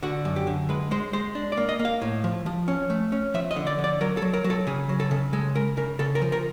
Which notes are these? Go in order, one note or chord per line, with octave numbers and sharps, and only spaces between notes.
D3 F#4
F#2
G4
D3
G#3 B4
G#3 C5
G#3 C5
D4
D5
A#3
D#5
A#3
F5
A2
F3
F3
C#4
A3
C#4
F3 E5
D#5
D3
D5
D3
D5
F#3 A#4
A4
F#3
A#4
F#3
A4
C#3 G#4
F#3
A4
C#3
G#3 A4
C#3 A#4
C#3 A#4
C#3 A4
A#4
F3
A#4